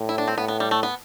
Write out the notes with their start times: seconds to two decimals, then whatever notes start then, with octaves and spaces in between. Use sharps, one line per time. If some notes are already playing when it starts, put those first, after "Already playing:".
Already playing: A2
0.09 E4
0.18 D4
0.28 C4
0.37 A2 B3
0.48 B3
0.60 G3
0.71 A3
0.83 B3